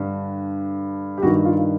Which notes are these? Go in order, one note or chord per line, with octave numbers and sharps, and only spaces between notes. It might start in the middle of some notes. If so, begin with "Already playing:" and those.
Already playing: G2 D3
G4
G2 D#3 F#4
F4